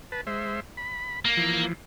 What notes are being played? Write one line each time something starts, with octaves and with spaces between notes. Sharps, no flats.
B4 A5
G#3 C5 E5
B5
A#3
E3 F3